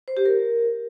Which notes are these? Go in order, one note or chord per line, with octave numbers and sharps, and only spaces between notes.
C5
G4
A#4